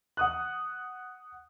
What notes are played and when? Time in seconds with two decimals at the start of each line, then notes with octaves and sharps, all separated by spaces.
0.17 F#5 D#6 F#6